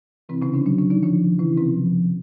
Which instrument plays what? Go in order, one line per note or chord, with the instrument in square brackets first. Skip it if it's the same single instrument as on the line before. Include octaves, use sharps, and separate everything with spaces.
[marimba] C3 C4 [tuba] E3
[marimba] C#3 C#4
D3 D4
[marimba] D3 D4 [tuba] F#3
[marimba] D3 D4
D#3 D#4
[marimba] D3 D4 [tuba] F3
[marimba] C#3 C#4 [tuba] E3
[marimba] C3 C4
[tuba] F3